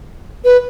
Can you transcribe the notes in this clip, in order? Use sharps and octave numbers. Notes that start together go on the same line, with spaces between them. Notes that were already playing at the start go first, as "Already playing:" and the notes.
B4